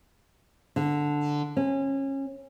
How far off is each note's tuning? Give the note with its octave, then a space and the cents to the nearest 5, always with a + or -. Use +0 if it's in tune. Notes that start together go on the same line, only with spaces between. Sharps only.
D3 +0
C#4 -25